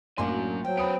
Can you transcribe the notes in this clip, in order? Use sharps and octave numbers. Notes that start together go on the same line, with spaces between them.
A1 F#2 F#3 A#3 D4 F#4 G#5 C6
F3 F#3 G5
B3 C5 B5 D#6 D7